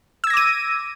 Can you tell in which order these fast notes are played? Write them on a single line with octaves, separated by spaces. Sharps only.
E6 G#6 A#6 D6 D#7